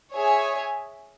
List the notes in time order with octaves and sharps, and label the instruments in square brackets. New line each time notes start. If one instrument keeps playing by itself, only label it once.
[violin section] G#4 C#5 E5 G#5